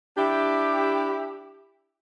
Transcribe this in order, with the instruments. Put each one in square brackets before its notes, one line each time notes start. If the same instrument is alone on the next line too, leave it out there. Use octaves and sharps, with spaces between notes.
[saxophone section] D4 E4 G4